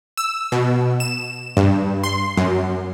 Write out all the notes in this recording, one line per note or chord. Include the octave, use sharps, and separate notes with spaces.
E6
B2
E7
G2
C6
F#2